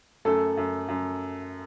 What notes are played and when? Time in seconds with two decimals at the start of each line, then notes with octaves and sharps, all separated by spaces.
0.25 F#2 A3 A4
0.57 F#2
0.88 F#2